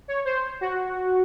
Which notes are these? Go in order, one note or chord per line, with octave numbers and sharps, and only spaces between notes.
C#5
C5
F#4